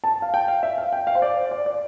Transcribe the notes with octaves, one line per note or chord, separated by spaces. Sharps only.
A5
F5
G5
F5
E5
F5
G5
F5
C5
D5
D5
D5